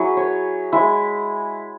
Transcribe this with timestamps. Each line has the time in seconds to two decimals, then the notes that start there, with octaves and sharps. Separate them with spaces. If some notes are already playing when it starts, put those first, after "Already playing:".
Already playing: F#3 E4 G#4 B4
0.17 C#5
0.73 G#3 E4